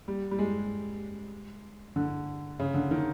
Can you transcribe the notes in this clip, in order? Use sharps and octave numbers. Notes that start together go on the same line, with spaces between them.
G3
G3
G#3
D3
C#3
D3
D#3